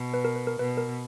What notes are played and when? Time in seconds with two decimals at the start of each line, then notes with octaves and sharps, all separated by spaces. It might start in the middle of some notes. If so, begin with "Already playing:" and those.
Already playing: B2
0.14 B4
0.25 A#4
0.36 B4
0.47 A#4
0.59 B2 B4
0.77 A#4